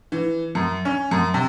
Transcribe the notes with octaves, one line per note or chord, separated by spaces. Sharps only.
E3
F#2
C#4
F#2
C3